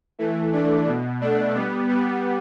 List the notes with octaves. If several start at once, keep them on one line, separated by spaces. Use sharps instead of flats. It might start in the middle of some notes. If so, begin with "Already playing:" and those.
E3 A3
A3 D4
B2
A3 D4
G3 B3
G3 B3